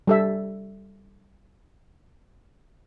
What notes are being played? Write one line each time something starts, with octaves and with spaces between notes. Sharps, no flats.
G3 A4 E5